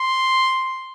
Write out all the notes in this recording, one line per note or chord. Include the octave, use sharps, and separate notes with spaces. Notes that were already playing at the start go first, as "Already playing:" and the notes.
Already playing: C6